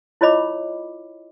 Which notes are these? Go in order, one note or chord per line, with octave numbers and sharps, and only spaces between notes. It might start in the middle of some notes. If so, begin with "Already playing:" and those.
E4 F4 C#5 D#5 B5 D6